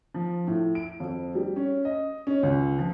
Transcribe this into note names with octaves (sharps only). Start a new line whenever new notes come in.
F3
A2
D7
F2
G3
C#4
D#5
C#4
C#2
F3